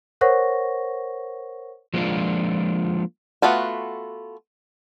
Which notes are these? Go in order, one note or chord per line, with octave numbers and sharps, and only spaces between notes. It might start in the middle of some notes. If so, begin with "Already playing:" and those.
A#4 C5 C#5 F#5 C#6 A#6
F3 G#3 A#3 B3 D4 F4
A3 B3 F4 F#4